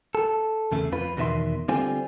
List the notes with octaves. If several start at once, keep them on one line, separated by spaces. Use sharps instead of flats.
A4
E2 C#3 A3
F2 F4 B4
E2 B2 D#3 E5 C6
D3 G3 C4 F4 C5 G#5